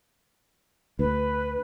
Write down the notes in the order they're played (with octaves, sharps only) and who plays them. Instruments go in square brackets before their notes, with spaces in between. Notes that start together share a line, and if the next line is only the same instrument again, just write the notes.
[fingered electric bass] D2 [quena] B4